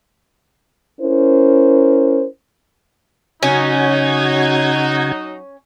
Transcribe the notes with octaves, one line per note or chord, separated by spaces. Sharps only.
C#4 E4 A#4 C5
C#3 F#3 C#4 D#4 F#4 G#6